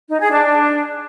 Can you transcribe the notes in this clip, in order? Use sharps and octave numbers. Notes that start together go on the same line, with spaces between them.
D#4
G#4
D4